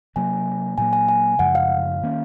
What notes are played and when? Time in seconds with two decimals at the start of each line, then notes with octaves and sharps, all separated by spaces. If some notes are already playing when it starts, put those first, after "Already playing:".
0.16 C3 F#3 A#3 G#5
0.78 A#2 F#3 A#3 G#5
0.93 G#5
1.08 G#5
1.39 F#2 C#3 F3 G#3 F#5
1.55 F5
2.02 D#3 A#3 C#4